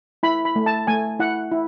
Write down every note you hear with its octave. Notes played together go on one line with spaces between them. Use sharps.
E4 B5
B5
A3
A5
A3 G#5
E4 F#5
E4